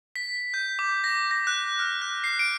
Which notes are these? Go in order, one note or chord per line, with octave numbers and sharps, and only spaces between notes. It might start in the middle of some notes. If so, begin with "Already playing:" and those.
B6
G6
D6
A#6
A#6
F#6
F6
F#6
C7
D7